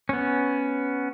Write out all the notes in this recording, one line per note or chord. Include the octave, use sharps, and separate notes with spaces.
B3 C#4